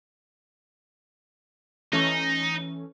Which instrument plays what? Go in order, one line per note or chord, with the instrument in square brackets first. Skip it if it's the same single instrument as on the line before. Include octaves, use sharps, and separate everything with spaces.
[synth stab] E3 A3 C#4 [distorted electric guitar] D#4